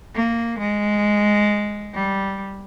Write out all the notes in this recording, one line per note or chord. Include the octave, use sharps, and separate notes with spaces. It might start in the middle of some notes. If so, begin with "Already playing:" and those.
A#3
G#3
G3